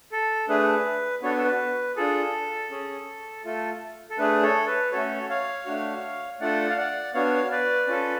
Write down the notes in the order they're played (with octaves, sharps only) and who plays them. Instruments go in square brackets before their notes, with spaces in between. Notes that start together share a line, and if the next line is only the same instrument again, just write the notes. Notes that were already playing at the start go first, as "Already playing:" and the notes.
[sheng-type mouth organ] A4
A3 D4 G#4 B4
B3 D4 F#4 A4 C#5
B4
A4
B4
D4 F4 G#4 A4
C#4 G#4
A3 F4 A4
A4
A3 D4 G#4 B4
A4 C#5
B4
A3 C#4 F#4 A4 C#5
C#5 F5
A3 D4 F#4
A3 D4 F4 A4 D5 F#5
F5
D5 F#5
B3 D4 F#4 C#5 F5
B4 D5
C#4 F4 A4